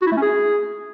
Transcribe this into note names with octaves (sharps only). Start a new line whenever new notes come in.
F#4
E4
A3
C#4
G#4